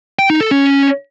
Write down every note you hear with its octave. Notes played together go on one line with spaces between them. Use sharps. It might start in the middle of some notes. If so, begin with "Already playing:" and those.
G5
D#4
A4
C#4